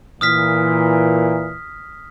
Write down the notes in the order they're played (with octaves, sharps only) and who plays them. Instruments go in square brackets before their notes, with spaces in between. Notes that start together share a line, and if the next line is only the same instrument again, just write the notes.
[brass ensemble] A#2 E3 [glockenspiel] D#6 F6 B6